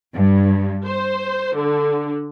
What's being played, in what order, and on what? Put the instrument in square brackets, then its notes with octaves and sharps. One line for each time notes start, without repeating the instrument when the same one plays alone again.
[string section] G2
C5
D3